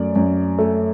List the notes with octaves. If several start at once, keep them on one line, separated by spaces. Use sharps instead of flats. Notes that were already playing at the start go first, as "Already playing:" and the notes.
Already playing: F#2 A3 D5
F#2
A3